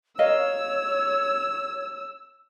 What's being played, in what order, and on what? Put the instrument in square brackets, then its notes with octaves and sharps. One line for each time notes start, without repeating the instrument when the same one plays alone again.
[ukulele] A#4 D#5 F5 [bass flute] C#5 [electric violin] E6